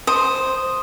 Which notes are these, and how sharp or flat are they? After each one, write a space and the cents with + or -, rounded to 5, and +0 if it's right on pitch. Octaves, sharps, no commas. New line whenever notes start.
C5 +0 D#6 +0